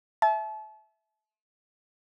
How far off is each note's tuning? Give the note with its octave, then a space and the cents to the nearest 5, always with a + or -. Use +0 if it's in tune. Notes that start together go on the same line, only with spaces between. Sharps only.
E5 +0 A5 -35